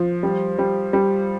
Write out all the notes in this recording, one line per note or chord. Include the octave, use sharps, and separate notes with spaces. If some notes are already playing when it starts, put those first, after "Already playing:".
Already playing: F3
G3
G3
G3